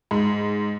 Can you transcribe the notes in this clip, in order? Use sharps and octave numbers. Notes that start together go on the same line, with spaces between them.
G#2